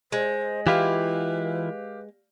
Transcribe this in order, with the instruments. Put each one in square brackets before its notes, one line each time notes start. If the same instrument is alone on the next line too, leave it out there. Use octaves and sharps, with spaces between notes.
[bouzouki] G#3 [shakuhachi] C5
[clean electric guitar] E3 E4 F4 [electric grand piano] G4 F5 [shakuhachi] B4